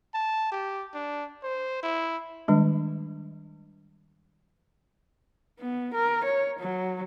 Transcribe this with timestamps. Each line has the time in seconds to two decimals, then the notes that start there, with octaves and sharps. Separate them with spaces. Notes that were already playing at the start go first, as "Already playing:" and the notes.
0.14 A5
0.52 G4
0.94 D4
1.43 C5
1.83 E4
2.48 D#3 G3 G#3 D4
5.59 B3
5.94 A#4
6.24 C#5
6.60 F#3